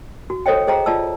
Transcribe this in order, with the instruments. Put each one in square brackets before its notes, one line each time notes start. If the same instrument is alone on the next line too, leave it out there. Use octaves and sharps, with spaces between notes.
[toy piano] F#4
A4 C5 C#5 D#5 G5
G#4 C5 D#5 G5 A#5
F4 D5 D#5 A5 E6